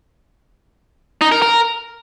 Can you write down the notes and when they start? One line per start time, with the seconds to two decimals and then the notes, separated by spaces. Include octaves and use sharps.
1.21 D#4
1.32 A#4
1.42 A#4